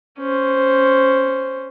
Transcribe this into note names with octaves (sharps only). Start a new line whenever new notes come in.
C#4 C5